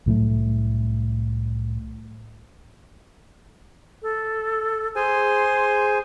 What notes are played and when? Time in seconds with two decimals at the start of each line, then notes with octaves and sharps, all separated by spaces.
0.06 C2 A2 F#3 A3
4.02 A4
4.96 G#4 C5 G#5 C6